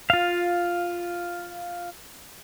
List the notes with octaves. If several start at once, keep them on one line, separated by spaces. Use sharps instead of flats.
F4 F5